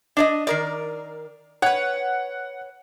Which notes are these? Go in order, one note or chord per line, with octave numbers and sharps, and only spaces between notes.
D4 D5 D#5
D#3 A#4 D5
B4 C#5 F#5